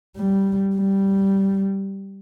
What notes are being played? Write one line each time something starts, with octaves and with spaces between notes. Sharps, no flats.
G3
G3